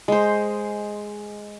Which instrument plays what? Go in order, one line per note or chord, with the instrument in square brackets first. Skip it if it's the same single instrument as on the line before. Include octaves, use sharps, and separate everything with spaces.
[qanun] G#3 C5